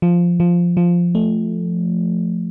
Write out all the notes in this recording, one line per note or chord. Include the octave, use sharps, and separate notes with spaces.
F3
F3
F3
A3